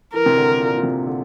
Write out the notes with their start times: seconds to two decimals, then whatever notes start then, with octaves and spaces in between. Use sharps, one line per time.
0.14 E3 A#4
0.26 C3
0.37 D3
0.60 A#2
0.77 A#2
0.83 C3
1.06 D3